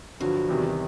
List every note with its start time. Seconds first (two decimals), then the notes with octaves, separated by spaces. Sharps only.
0.20 G2 D3 F3 F#3
0.49 E2 C3 D#3 G3